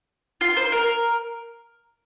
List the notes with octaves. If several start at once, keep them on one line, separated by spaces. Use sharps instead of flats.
F4
C5
A#4